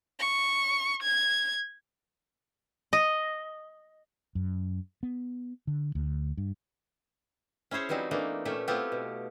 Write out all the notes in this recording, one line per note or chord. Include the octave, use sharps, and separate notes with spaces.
C#6
G#6
D#5
F#2
B3
D3
D2
G2
C#4 E4 G#4 C5 C#5
E3 F#3 G3 C4 D#4
E3 A3 A#3 D4 D#4
A#2 A3 C#4 G4 E5
A3 B3 C4 E4 F4 G4
B2